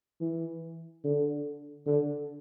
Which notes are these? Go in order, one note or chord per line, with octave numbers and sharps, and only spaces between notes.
E3
D3
D3